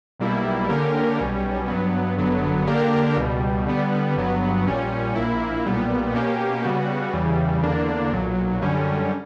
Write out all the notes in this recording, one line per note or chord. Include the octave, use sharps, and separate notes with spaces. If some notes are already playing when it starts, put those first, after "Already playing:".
B1 B2 G3 A#3 E4
D3 A#3 C#4 G4 A#4
B1 B2 G3 C#4
G2 F#3 B3
G1 F#2 D3 F#3 B3
D3 A#3 D4 G4 A#4
C#2 B2 G3
D3 G3 B3
G1 G2 F#3 B3
A#1 A#2 G3 C#4
A#1 A#2 A#3 E4
B1 A#2 G3 B3
B2 A#3 C#4 G4
C#3 G3 B3 F#4
E2 C#3 E3 G3
E2 D3 A#3 D4
B1 A#2 F#3
F#2 D3 G3 C#4